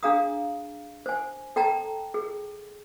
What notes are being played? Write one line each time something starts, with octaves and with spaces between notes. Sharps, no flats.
D4 G#4 F5 A#5 D#6
C5 G#5
A4 G5 A5 A#5
G#4